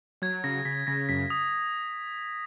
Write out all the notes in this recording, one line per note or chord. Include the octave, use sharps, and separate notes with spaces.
F#3 G#6
C#3 A#6
C#3 B6
C#3 A#6
F#2 B6
D#6